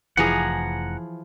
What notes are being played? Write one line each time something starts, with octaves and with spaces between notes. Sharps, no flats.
F1 E3 F3 G#4 F#5 A#5